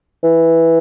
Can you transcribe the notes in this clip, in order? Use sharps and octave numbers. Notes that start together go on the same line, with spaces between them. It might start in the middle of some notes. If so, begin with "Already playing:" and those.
E3